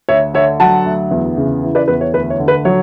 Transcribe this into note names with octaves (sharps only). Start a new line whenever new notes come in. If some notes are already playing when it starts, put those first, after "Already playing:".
D2 C#5 E5
D3 C#5 E5
F#3 F#5 A5
D2
E2
C#3
E3
B4 D5
E2 B4
C#5
D2 B4
C#5
D3
B4
F#3 C#5